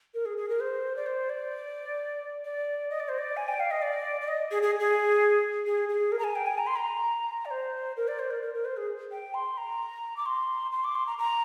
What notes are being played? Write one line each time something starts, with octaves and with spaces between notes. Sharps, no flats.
A#4
G#4
G#4
A#4
C5
D5
C5
D5
D5
D#5
D5
C5
D5
G#5
G5
F5
D#5
D5
D5
D#5
G#4
G#4
G#4
G#4
G#4
A#4
A#5
G#5
G5
G#5
A#5
C6
A#5
D5
C5
A#4
D5
C5
A#4
A#4
A#4
C5
G#4
G5
C6
A#5
D6
C6
C6
D6
C6
A#5
A#5